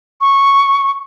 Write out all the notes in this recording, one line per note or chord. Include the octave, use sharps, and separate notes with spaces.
C#6